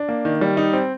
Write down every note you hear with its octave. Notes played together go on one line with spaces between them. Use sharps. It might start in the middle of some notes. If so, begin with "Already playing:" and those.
Already playing: D4
A#3
D#3
G3
D#4
C4